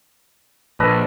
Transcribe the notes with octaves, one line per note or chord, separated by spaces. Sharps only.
A#1 A4 B4 D#5